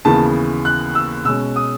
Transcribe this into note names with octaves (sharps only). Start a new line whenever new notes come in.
D#2 C#3 E3 B3 A5
F#6
E6
B2 G#3 C#4 E6
D#6